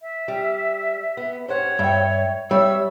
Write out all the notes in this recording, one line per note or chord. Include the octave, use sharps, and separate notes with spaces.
E5
G3
B3
G2 C5 C#5 F#5
G2 E5 G5
G3 C#5 E5 E6